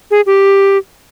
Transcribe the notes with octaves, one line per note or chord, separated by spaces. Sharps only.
G#4
G4